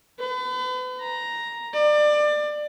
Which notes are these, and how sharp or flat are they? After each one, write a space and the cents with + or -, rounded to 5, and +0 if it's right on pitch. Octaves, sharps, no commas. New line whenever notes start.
B4 +40
A#5 +5
D5 +25